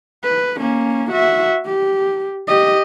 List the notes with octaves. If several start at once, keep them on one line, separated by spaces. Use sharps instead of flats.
B4
A#3 C#4
F#4 E5
G4
G4 D#5